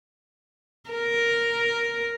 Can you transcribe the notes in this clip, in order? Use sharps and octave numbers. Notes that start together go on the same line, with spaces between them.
A#4